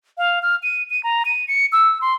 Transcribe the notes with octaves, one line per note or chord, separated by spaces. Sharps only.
F5
F6
D#7
D#7
A#5
D#7
C#7
E6
C6